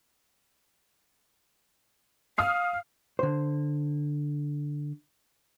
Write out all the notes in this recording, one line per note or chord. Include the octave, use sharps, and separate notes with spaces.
F5 D#6 F6 C7
D3 C5